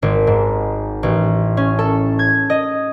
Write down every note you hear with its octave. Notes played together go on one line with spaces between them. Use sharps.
G#1
G#2
A1
C#4
A4
G#6
D#5